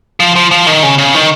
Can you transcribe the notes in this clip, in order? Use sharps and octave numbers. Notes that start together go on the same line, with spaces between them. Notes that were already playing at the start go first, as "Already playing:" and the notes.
F3
F3
F3
D#3
C#3
C#3
D#3